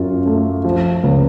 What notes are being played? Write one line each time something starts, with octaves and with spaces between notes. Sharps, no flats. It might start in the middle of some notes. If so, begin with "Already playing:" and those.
Already playing: F#2 F4
A3
F3
C#2